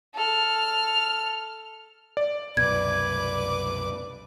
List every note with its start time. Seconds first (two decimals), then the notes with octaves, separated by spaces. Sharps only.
0.15 A4 F6
2.17 D5
2.57 C2 F#2 B2 B4 D6 G#6